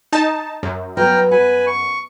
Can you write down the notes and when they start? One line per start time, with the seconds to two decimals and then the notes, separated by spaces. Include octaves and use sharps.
0.12 D#4 A5
0.63 F#2
0.97 F#3 B3 B4 G5 A#5 F6
1.31 B4 F#5 G#5
1.67 C#6